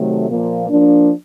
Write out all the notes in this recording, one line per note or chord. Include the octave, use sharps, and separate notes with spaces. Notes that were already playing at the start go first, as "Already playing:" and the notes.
Already playing: C3 D#3 F#3 A3
A#2 F3 A#3
F3 A#3 D4